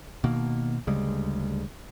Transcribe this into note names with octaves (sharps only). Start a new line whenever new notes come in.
B2 D#3 A#3
D2 C#3 G3 G#3